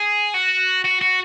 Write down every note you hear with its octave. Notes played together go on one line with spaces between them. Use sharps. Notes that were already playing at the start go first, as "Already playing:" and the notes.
Already playing: G#4
F#4
F#4
F#4